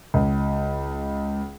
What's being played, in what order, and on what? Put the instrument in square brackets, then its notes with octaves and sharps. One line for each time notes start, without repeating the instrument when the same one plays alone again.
[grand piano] C#2